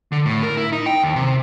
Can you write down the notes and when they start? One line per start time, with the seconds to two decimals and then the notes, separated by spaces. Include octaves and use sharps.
0.12 D3
0.25 A2
0.43 A#4
0.57 E4
0.72 D#4
0.86 G5
1.04 D#2
1.16 C3